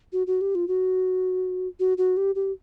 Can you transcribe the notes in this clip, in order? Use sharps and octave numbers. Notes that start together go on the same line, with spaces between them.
F#4
F#4
G4
F4
F#4
F#4
F#4
G4
G4